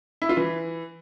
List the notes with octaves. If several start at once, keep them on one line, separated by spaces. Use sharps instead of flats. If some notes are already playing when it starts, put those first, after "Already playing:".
E4
F4
E3